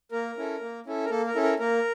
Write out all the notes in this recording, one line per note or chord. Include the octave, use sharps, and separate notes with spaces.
A#3 A#4
C#4 E4 A4
A#3
C#4 E4 A4
A#4
A#3 A4
A#4
C#4 E4 A4
A#4
A#3 A#4